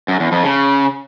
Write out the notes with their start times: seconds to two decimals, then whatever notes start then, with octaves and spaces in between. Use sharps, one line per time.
0.08 F#2
0.20 E2
0.32 F2
0.44 C#3